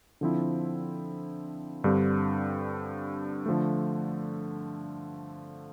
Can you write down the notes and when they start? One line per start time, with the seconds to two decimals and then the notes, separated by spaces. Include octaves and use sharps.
0.21 D3 F3 C4 E4
1.84 G2 D3 G3 C4
3.46 D3 F3 A3